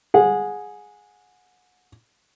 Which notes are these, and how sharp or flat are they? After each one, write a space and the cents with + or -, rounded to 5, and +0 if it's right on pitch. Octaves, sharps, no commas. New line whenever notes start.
G#4 +0 F#5 -25